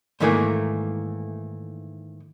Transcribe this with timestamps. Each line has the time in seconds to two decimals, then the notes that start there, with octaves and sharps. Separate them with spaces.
0.20 G#2 D#3 E3 A3 A#3 G#5